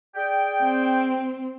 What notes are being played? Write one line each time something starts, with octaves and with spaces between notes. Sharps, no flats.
G#4 D5 G5
C4